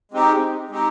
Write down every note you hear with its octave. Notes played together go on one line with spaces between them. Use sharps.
G#3 C4 D#4 G4
G#3 C4 D#4 G4